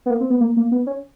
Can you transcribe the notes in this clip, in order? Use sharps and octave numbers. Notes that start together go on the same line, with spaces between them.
B3
A#3
C4
B3
A#3
A#3
B3
C#4